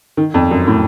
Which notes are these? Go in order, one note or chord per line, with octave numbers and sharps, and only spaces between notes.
D#3
F2
F#2
A2